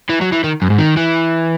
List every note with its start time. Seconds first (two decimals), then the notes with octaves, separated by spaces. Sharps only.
0.10 E3
0.21 F#3
0.32 E3
0.44 D#3
0.62 F#2
0.70 G#2
0.78 D#3
0.97 E3